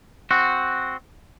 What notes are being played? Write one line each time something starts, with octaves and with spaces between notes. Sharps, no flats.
C4 F#4